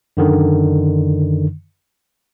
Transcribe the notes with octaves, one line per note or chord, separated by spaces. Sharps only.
F#2 D3 D#3